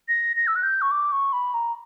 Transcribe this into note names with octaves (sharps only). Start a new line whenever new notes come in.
A#6
A#6
E6
F#6
G6
C#6
D6
C#6
B5
A#5